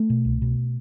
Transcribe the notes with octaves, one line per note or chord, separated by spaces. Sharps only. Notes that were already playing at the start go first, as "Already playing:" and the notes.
Already playing: A3
B2
C2
B2